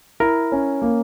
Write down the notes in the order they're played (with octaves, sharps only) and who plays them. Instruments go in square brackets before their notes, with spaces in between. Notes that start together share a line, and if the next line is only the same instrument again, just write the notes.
[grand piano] E4 [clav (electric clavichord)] A#4
[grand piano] C#4
A#3